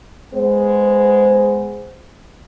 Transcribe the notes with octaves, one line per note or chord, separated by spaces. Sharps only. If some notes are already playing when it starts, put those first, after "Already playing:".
G#3 B3 C5